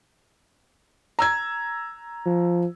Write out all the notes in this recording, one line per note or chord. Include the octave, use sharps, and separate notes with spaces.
A#5 E6 G#6
F3